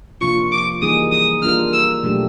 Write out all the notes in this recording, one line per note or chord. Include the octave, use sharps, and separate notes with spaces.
C3 F3 A#3 D4 F4 C#6
D6
E3 G3 A#3 D#4 G#4 D#6
D#6
G3 A#3 D4 F4 A#4 F6
E6
B2 F#3 A3 D4 G4